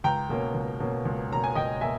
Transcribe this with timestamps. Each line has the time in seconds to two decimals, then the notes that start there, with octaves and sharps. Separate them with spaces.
0.04 C#2 G5 A#5
0.29 B2 A#3 C#4
0.54 C#2
0.80 B2 A#3 C#4
1.05 C#2
1.31 B2 A#3 C#4 A#5
1.44 G#5
1.55 C#2 D#5 G5
1.81 B2 A#3 E5 G#5